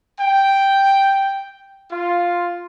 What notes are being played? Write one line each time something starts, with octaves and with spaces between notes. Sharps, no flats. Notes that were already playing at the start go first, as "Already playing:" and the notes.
G5
F4